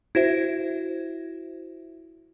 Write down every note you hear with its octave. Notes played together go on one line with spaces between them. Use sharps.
E4 F#4 C5 E5